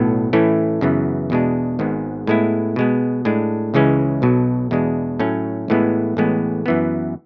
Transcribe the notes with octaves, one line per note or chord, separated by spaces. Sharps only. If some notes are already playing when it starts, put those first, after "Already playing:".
Already playing: B1 A2 F#3 B3
A2 E3 A3 C#4 E4
F#2 C#3 E3 B3
E2 B2 G#3 D4
G#1 G#2 G#3 B3
A2 G#3 B3 E4
B2 G#3 B3
A2 G#3 D4
C#2 C#3 E3 G#3 C#4
B1 B2 F#3
E2 B2 G#3 D4
A2 F#3 A3 C#4
A1 A2 E3 G#3 B3
A1 A2 G#3 B3
F#2 E3 B3